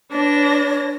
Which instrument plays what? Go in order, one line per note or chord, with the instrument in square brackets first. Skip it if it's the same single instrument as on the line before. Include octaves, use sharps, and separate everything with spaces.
[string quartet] D4 B4 A#6 [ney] C#5